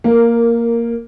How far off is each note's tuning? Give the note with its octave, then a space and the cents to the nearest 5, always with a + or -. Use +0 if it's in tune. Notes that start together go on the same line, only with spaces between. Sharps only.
A#3 +0 A#4 -15